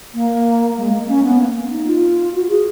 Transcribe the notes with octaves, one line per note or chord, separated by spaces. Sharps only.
A#3
G#3
A#3
C#4
B3
A#3
D#4
F4
F#4
G#4